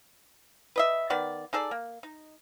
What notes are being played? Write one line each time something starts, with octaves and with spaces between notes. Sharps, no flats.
B4 D#5 E5
D#3 B3 D5
D#4 G#4 A4 D5
A#3
D#4